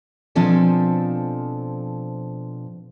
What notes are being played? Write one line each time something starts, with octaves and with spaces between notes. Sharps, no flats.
B2 F3 C4 D4 A4 G#5